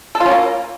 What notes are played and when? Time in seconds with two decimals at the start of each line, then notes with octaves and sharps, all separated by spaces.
0.15 A4
0.20 F4
0.26 C#4
0.31 A#3